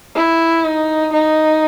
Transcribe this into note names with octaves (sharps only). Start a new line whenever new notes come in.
E4
D#4
D#4